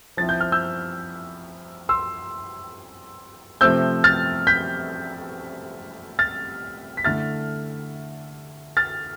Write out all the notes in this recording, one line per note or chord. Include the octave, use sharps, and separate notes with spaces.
F3 C4 E4 A6
G6
F6
E6 G6
C6 E6
C3 F3 A3 C4 E6 G6
F6 A6
G6 B6
F6 A6
B6
D3 A3 E4 F6 A6
F6 A6